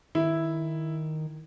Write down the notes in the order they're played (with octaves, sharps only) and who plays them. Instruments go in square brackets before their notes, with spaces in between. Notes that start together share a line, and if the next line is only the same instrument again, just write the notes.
[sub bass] D#3 [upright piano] E4